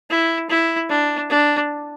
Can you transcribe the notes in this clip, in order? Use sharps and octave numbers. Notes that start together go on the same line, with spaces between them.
E4
E4
D4
D4